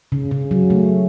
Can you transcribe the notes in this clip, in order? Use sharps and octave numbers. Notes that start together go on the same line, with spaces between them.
C#3
C#3
F#3
A3